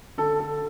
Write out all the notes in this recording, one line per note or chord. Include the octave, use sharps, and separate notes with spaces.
D3 A4
A4